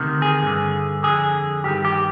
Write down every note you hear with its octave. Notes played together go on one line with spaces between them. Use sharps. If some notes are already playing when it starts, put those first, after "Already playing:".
Already playing: D2 C3 D#3
G#4
G2 D3
F2 D3 G#4
G2 D#3 G4
G4